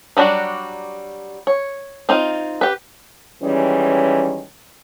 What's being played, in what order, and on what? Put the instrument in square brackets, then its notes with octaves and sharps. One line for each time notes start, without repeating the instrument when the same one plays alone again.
[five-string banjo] F#3 G3 D4 F#4
C#5
C4 D#4 F4
G4 B4
[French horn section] D#3 E3 G3 G#3 C#4